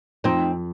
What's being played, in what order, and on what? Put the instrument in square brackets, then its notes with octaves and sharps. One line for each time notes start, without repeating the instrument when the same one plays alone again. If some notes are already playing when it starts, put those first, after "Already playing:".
[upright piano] F2 [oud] C4 D#4